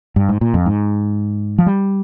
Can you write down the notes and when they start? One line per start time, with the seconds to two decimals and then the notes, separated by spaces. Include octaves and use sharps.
0.16 G2
0.29 G#2
0.41 A#2
0.54 F2
0.66 G#2
1.58 F3
1.66 G3